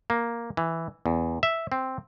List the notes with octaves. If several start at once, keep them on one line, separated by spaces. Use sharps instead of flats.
A#3
E3
E2
E5
C4